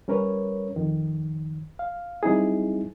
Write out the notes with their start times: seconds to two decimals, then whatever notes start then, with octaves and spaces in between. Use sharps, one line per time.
0.08 G3 C#4 A#4 B4 C#5
0.76 F2 D#3
1.79 F5
2.23 F#3 G3 C4 D#4 E4 G#4